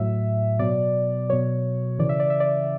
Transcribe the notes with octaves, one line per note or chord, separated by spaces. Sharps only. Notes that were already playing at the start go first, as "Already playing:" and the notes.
Already playing: A2 F#3 E5
B2 F#3 D5
B2 F#3 C#5
C#3 E3 D5
E5
D5
E5
D5